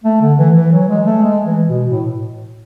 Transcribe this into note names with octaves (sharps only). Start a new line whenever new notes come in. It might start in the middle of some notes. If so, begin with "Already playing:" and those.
A3
D3
E3
E3
F#3
G#3
A3
G#3
E3
B2
A2